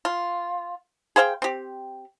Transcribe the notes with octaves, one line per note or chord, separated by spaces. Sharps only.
F4
G#4 C5 F5 G5
C4 G4